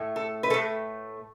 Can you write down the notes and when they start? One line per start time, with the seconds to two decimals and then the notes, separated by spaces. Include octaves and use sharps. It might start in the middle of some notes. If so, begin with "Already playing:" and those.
Already playing: A2 A3
0.16 A4
0.43 B4
0.50 A2 A3 A4